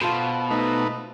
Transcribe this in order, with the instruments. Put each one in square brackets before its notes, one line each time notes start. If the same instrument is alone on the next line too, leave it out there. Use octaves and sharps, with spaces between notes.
[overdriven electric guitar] B2 [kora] F4 A4 C5
[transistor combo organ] A3 D#4 B4